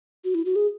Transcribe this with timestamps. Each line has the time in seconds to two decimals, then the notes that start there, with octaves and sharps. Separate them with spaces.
0.25 F#4
0.35 E4
0.46 F#4
0.56 G#4